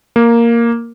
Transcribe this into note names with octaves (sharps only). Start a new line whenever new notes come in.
A#3